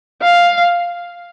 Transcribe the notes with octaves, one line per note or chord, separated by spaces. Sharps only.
F5